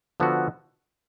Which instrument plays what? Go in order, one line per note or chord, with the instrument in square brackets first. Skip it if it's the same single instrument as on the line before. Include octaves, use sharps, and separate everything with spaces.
[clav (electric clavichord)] D3 F3 B3 F#4 A4